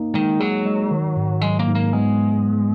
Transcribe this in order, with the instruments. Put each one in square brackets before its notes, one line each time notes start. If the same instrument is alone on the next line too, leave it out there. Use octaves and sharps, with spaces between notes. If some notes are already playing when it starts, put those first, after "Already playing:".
Already playing: [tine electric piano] A#3 D#4
[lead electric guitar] D#3 [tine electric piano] G#3
[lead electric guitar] F#3 [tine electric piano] G#4
[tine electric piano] G#3
D#3
G#2
[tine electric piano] F#3 [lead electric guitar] G#3
[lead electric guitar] A#3
[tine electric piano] G#2
[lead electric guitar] A#3
[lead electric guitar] G#3 [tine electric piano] B3